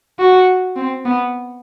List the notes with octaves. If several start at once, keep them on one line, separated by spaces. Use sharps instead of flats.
F#4
C4
B3